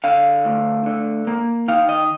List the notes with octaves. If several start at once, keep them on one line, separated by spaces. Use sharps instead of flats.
D3 F5
D2
D3
A#3
D#3 F5
D#5